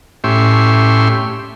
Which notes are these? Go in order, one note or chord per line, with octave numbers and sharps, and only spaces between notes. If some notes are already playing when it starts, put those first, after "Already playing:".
A2 C#4 G4 E5 C6